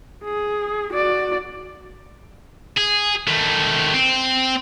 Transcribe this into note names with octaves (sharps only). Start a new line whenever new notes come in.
G#4
F#4 D5
G#4
D#3 A3
C4